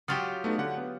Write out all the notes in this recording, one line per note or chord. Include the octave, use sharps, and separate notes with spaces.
F#3 F4 G4 D#6 F6 A6
A3 B3 D#4
D3 F#5
B3